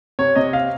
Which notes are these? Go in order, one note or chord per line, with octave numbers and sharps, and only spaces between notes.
C3 C#5
C3 D#5
F5